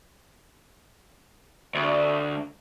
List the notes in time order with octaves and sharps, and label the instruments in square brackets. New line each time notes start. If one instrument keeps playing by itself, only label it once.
[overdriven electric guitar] D2